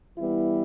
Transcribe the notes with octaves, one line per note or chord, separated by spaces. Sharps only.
E3 G3 B3 E4